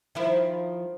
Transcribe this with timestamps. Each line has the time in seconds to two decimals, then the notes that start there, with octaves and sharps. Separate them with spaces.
0.15 D#3 F3 E4